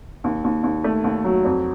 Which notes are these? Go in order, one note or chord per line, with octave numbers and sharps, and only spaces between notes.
D#2
D#2
D#2
A3
D#2
F#3
F2